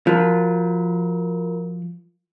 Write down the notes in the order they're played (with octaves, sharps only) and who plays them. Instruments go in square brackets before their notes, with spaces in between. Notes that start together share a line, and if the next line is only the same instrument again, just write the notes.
[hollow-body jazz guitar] F3 [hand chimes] F4 F#4 A#4